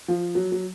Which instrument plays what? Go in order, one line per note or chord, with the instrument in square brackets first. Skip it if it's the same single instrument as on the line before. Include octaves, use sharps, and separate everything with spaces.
[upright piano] F3
F#3
F#3